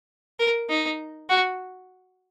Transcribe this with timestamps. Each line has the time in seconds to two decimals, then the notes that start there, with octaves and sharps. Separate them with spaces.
0.39 A#4
0.69 D#4
1.29 F#4